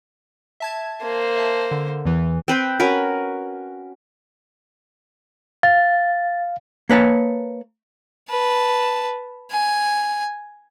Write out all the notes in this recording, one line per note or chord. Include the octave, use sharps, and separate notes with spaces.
E5 A5 G#6
A#3 C5
E5 A5
D3
E2 E3
C4 B4 C5 G5
C#4 F#4 A#4 B4
F5 A6
A#3 B4 C#5 A5
B4 A5
G#5